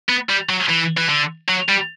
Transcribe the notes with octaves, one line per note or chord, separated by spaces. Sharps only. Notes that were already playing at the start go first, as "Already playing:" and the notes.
B3
G3
F#3
E3
E3
D3
F#3
G3